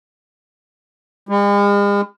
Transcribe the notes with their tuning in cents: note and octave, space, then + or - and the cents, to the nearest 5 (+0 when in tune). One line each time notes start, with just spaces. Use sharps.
G#3 -45